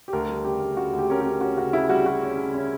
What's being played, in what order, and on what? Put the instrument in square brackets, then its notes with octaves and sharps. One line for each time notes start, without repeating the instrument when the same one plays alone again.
[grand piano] G4
D2 A#4
G3
C#3 G4
D2
C#3 F#4
D2
G4
C#4 A#4
G4
C#4
C#4 F#4
C#3 F#4
C#3 E4
G3 F#4
G3 F#4
C#4
C#3
C#4